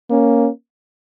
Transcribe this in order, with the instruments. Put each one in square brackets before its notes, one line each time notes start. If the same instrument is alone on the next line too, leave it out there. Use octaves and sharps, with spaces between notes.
[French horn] A#3 [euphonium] C#4